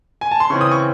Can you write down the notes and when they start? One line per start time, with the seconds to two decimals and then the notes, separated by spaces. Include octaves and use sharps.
0.21 G#5
0.31 A5
0.40 C6
0.50 C#3 E3 C4 C#6
0.61 D#6
0.71 C#6